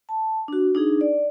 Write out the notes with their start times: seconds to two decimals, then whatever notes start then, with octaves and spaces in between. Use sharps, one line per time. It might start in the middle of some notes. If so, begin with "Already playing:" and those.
0.09 A5
0.48 D4 F#4
0.75 D4 D#4 G#4
1.01 D5